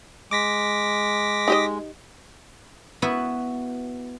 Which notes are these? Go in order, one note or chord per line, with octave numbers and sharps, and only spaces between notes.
G#3 D6 A#6 B6
D#4 G4 D#5
B3 E4 F#4 B4